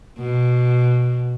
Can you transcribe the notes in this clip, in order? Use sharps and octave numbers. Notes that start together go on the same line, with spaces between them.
B2